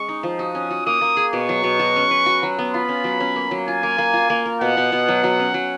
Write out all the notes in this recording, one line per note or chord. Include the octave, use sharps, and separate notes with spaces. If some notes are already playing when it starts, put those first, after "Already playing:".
Already playing: G#3 C#4 C#6
D#4
F3
F#4 D#6
C#4
F#4
A#3 D#6
A#3
G#4
B2 C#6
F#3
B2
F#4
C#4
B4
F#4
F#3
B3
F4 B5
C#4
F#3
C#4
A#3
F#3
F4 G#5
A#3
A#3
F4
A#3
A#4
B2 F#5
B2
B2
F#3
F#3
C#4
F#3